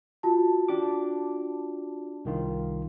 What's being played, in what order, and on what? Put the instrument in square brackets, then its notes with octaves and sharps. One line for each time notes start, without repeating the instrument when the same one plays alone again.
[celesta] F4 F#4 A5
[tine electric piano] D4 G4 D6
C2 D#3 F4